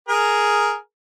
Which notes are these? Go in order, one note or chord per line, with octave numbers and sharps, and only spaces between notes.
G#4 A#4